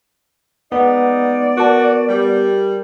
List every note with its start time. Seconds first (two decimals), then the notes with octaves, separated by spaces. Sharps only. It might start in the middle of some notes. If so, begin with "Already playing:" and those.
0.72 G#3 B3 D#4 D5
1.57 F#4 A#4 A5
2.09 G3